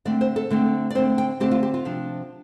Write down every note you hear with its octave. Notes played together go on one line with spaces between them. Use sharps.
D3 A3 C4 D5
C5
A4
D3 A3 C4
D5
D3 A3 C4 C5
G5
D3 A3 C4 G4
F4
G4
F4
C3 F3 D4